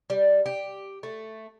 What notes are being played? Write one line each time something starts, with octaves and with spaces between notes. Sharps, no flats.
G3
G4
A3